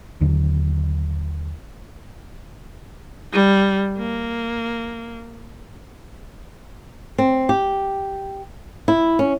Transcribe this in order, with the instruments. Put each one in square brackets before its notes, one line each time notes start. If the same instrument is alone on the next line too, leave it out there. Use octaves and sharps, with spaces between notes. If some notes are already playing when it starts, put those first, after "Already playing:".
[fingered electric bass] D#2 D3 F#3
[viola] G3
A#3
[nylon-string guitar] C4
G4
E4
C#4